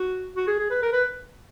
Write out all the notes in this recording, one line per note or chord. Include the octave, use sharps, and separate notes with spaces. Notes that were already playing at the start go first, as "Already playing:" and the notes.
Already playing: F#4
F#4
G#4
G#4
B4
A#4
B4